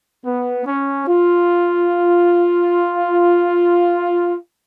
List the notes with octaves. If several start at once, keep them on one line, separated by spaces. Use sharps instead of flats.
B3
C#4
F4